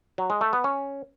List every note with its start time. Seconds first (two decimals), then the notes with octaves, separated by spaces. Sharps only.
0.18 F#3
0.30 G#3
0.41 A3
0.53 B3
0.64 C#4